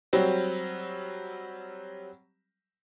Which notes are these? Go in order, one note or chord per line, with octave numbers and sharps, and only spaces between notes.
F#3 G3 C4